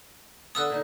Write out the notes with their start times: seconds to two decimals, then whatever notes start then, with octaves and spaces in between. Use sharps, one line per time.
0.55 D3 B3 A5 D#6 E6 F#6
0.70 A#2 D3 D#4